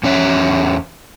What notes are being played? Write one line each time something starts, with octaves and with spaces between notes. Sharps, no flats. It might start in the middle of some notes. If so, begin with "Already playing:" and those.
E2 C#4 C#5 E5